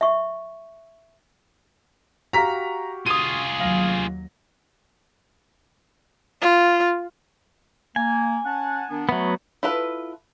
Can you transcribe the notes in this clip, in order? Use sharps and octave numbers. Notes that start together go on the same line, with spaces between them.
E5 C#6
F#4 G4 F5 A#5 B6
F4 G#4 D#6 D#7
D#2 F#3 F5 A#6
F4
A#3 G#5
C#4 F#5 A5
D#3 B3 D4
F#3 A3 B3
E4 F4 A4 B4